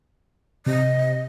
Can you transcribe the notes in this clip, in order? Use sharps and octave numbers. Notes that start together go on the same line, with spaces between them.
C3 D#5